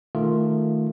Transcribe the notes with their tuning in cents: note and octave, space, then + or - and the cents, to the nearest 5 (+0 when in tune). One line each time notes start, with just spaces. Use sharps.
D#3 +0 A3 +0 F4 +0